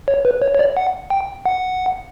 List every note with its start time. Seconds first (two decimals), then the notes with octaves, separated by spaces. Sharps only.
0.08 C#5
0.25 B4
0.42 C#5
0.55 C#5
0.59 D5
0.77 F#5
1.10 G5
1.46 F#5